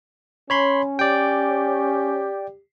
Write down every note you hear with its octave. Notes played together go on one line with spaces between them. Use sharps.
C#4 C#5 B5 C6
G4 D5 G5